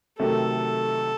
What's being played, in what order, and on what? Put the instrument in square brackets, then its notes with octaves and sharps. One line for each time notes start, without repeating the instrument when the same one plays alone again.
[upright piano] C3 D#3 F#3 A3 [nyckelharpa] A4